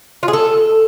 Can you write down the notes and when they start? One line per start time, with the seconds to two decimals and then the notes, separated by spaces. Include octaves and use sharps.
0.23 F4
0.28 G#4
0.33 A4